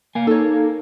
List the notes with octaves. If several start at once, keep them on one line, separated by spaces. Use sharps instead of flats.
A#3 F5 G#5
D#4 A4 C#5